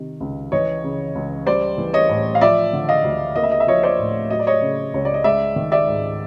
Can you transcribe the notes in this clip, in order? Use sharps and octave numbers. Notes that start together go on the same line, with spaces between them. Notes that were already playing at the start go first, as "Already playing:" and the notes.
Already playing: C3 D#3
C#2
E3 C#5 D#5
C#3
C#2
G3 C5 D5
E3
C#5 D#5
A2
F5
F3 D5 E5
D3
D#5 F5
D2
A#3 D#5
E5
D#5
E5
F3 C#5 D#5
C5 D5
A2
F#3 D#5
D5
C#5 D#5
C#3
C#2 C#5
D5
D#5
G#3 D5 E5
D#3
D5 E5
G#2